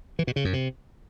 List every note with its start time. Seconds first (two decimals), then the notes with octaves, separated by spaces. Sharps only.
0.19 E3
0.27 B2
0.36 C#3
0.45 F#2
0.53 C3